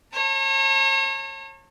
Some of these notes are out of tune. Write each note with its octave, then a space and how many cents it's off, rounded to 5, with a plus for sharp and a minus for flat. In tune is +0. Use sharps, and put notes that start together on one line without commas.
C#5 -35 A5 +35